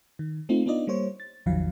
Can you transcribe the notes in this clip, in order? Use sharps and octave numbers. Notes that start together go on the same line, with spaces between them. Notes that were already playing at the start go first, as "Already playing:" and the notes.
D#3
A3 C4 D#4 F4
B3 D4 D#4 F4 D5 D#5
G3 A#3 C5 C#5
A6
A1 E2 D#3 F3 F#3 F5